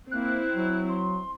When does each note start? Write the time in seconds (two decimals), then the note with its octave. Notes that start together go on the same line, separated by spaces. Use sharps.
0.11 A#3 C4 E4 F#6
0.55 F#3
0.89 C6